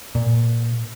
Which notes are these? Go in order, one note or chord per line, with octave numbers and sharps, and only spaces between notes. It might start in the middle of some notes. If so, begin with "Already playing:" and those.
A#2